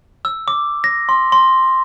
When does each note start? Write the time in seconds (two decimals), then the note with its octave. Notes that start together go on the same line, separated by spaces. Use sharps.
0.25 E6
0.48 D6
0.84 A#6
1.09 C6
1.32 C6